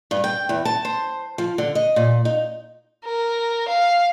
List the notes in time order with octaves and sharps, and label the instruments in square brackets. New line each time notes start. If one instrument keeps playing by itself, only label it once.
[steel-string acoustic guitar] G2
G5
E2
A5
C5
F3
D3
D#5
A#2
D#4
[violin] A#4
F5